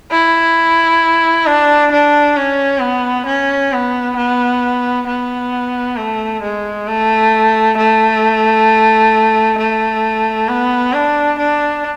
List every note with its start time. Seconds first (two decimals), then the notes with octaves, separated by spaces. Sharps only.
0.11 E4
1.46 D4
1.92 D4
2.36 C#4
2.81 B3
3.26 C#4
3.72 B3
4.16 B3
5.06 B3
5.96 A3
6.42 G#3
6.87 A3
7.77 A3
9.58 A3
10.48 B3
10.93 D4
11.38 D4